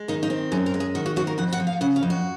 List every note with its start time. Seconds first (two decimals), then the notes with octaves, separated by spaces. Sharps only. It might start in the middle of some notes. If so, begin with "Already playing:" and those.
Already playing: G#3
0.08 D#3 D#4
0.23 D#4
0.30 C4
0.52 F#2 G#4
0.66 A#4
0.74 G#3
0.80 G#4
0.95 D#3 F#4
1.06 F#4
1.16 C4 F#4
1.27 A#4
1.38 F2 F#5
1.53 F#5
1.60 F3
1.67 F5
1.81 C#3 F#5
1.96 F5
2.03 F2
2.10 F#4